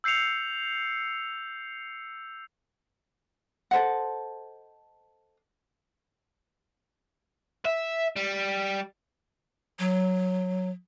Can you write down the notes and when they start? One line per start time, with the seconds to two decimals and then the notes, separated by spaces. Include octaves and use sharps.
0.04 E6 G6 C7 C#7 F7
3.71 A4 C5 D#5 F#5
7.65 E5
8.16 G3
9.79 F#3